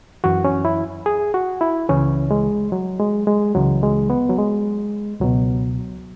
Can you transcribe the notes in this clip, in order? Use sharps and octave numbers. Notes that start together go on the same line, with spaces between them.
F#2 E3 F#4
C#4
E4
G#4
F#4
E4
C#2 C#3 E3 C#4
G#3
F#3
G#3
G#3
C#2 C#3 E3 F#3
G#3
B3
F#3
G#3
C#2 B2 F#3